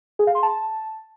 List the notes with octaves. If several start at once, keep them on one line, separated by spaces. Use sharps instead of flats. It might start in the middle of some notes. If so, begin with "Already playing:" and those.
G#4
F5
C6
A5